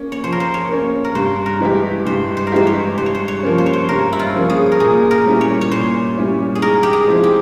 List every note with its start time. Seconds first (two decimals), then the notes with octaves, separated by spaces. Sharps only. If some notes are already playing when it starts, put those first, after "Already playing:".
Already playing: A#3 C#4
0.12 C#5
0.24 F3 C5
0.32 A#4
0.40 C5
0.54 C#5
0.69 A#3 C#4
1.04 A#4
1.15 G2 C5
1.46 A#4
1.60 E3 G#3 E4 G4
2.06 G2 C5
2.37 C5
2.47 A#4
2.52 E3 G#3 E4 G4 C5
2.67 C#5
2.97 G2 C5
3.06 C#5
3.15 C5
3.28 C#5
3.43 F3 A#3 C#4
3.58 C5
3.66 C#5
3.73 C5
3.89 G2 A#4
4.13 E4
4.19 F4
4.34 F3 A#3 C#4
4.50 G#4
4.72 A#4
4.80 A#2 G#4
5.11 A#4
5.25 G3 C#4 E4
5.41 C#5
5.61 C#5
5.71 A#2 C5
6.17 G3 C#4 E4
6.55 G#4
6.62 G#2 A#4
6.83 G4
6.93 G#4
7.08 F3 G#3 C4 E4
7.24 G4